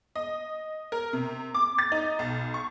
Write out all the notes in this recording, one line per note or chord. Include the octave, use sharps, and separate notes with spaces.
D#5
A#4
C3
D6
A6
D#4
B1
C#6